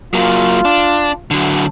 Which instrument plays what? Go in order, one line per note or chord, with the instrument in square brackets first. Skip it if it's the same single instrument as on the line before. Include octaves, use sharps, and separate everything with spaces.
[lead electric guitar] F#3 A#3 [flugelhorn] F4
[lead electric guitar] D4
D3 F#3